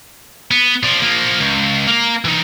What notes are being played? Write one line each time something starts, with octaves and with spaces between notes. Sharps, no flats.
B3
F3 D4
F3 A#3
C#2
A#3 A#5
E3 D#4